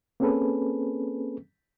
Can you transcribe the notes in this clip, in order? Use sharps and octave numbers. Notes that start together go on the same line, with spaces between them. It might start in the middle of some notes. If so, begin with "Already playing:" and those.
A#3 C4 C#4 G#4 A4 B4